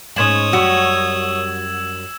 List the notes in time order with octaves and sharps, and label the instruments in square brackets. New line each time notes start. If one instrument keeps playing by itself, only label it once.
[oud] G#2 G#3 C#4 [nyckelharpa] C#5 D#6 [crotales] G#6 E7 F#7
[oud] F#2 G3 [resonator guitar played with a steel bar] F#4 [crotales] E6